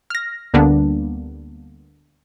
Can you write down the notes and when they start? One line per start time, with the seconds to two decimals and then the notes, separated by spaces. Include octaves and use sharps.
0.10 F6 A#6
0.54 D2 D3 G3 A#3 B3 D4